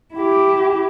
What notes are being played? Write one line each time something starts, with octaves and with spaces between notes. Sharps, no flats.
E4 G4